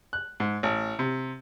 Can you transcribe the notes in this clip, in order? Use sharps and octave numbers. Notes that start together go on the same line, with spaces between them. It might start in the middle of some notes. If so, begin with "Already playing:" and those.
F#6
G#2
A1
C3